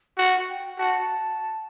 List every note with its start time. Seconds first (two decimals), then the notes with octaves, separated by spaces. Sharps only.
0.18 F#4 F#5
0.49 G5
0.78 F#4 A5